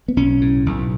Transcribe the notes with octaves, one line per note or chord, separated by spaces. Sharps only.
B3
B1 C#4
A2
B1